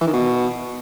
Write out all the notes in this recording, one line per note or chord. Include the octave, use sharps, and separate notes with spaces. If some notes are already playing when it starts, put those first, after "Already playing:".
E3
D#3
B2